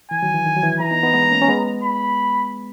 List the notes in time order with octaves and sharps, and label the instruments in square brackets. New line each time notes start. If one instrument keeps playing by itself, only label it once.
[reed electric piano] E3 [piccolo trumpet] G#5
[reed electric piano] D#3 F#3
E3
D#3
F#3
E3
[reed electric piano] E3 [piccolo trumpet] A#5
[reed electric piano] B3 D#4
B3 D#4
G#3 B3
A#3 C#4
C#4
G#3 B3
[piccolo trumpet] B5